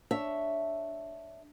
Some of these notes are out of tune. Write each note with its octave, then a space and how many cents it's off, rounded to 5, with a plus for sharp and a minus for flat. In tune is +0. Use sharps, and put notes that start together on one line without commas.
D4 +0 C#5 +0 E5 +0